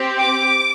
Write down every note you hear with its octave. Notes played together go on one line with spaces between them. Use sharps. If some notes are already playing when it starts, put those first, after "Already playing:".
Already playing: C4 G4
D6